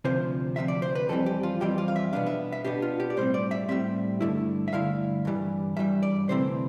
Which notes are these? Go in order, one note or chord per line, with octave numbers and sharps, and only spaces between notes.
D2 C3 F3 C5
D2 C3 F3 E5
D5
C5
B4
F2 E3 G3 C4 A4
G4
F4
F2 E3 G3 C4 G4
F4
F5
E5
B2 B3 D4 F5
E5
E5
B2 B3 D4 G4
F4
G4
D5
A2 G3 C4 C5
D5
E5
A2 G3 C4 E5
G2 D3 A3 E4
E5
G2 D3 A3 E4 F5
G2 E3 G3
G2 E3 G3 E5
D5
D2 C3 E3 A3 C4 C5